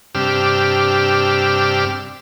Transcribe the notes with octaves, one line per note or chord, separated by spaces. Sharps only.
G2 C3 D4 G4 E6 F6